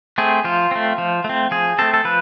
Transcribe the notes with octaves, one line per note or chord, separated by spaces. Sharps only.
A3 C4 G#4
F3 F4
A3 C4
F3
A3 C4
F3 G#4
A3 C4 A4
A4
F3 B4